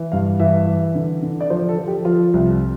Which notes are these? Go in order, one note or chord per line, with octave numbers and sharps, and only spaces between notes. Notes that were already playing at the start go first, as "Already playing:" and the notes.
Already playing: E3
G2 F5
E3 E5
E3
D3
D3
D5
F3 C5
A4
F3
G4
F3 F4
C2